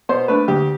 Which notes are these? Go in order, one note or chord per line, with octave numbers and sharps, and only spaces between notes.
B2 C5
A3 D4 B4
D2 G4